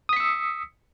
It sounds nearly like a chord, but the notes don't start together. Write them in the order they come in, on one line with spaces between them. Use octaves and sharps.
D#6 B6 C#7 E6